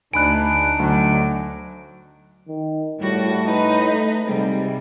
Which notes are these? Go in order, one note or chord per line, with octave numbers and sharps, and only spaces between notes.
D2 D4 D#4 G#5 B5 F#6 D7
D2 F#3
D#3
A2 G3 F#4
D#4 B4
A3
G#2 C3 G3